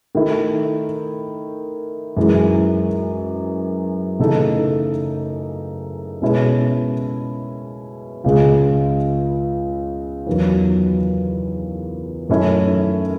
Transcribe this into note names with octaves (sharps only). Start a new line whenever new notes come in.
D#3 A3 E4 A4
F#2 E3 G#3
C#3 E3 A3 D#4 A4
B2 G#3 C#4 E4
C#2 C#3 G#3
E2 D#3 F#3
F#2 D#3 A3 C#4 E4